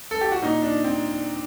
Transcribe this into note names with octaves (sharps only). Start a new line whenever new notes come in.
A4
G4
F#4
A#2 D#4
D4
C4